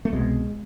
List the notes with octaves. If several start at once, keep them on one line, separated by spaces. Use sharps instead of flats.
A3
C2 B2 G#3